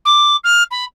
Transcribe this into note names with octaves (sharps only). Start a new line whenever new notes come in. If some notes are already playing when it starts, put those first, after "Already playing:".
D6
F6
B5